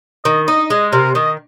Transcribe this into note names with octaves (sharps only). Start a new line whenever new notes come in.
D#3 D#5
D#4 D#5
G#3 D#5
C3 A#4
D#3 D#5